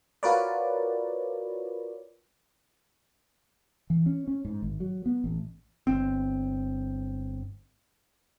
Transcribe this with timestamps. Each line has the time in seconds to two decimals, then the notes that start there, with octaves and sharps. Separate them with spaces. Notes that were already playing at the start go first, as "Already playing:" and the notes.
0.23 F4 F#4 A#4 B4 C#5 D5
3.90 E3
4.06 C#4
4.27 C#4
4.45 G#2
4.62 G#1
4.80 F#3
5.06 B3
5.24 A1
5.87 G1 C4